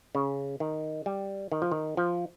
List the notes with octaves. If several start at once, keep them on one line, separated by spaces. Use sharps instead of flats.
C#3
D#3
G3
D#3
F3
D#3
F3